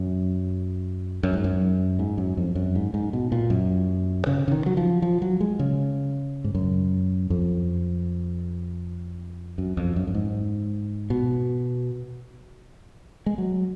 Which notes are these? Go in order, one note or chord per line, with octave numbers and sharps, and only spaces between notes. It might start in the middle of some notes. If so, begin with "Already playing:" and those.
Already playing: F#2
F#2
G#2
F#2
G#2
F#2
F2
F#2
G#2
G#2
B2
A#2
F#2
C#3
C#3
D#3
F#3
F3
F3
F#3
G#3
C#3
G#2
F#2
F2
F#2
F2
F#2
F#2
G#2
B2
G#3
F#3